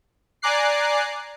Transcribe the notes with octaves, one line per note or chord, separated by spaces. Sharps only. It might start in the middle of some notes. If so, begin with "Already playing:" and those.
D5 G#5 A#5 D6 F#6 C7